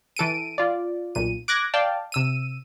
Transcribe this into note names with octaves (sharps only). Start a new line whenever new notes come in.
E3 A4 D7 D#7
F4 D5
B1 A#2 D#7
D6 F#6 G#6 A#6
D5 F5 G5 A5
C3 E6 D#7